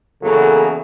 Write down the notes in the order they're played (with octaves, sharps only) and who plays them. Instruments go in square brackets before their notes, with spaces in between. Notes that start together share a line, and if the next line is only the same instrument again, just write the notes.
[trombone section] E2 F#3 A#3 [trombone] C#3 [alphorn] A4